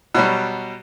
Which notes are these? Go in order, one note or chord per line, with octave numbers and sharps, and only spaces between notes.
B2 F#3 G3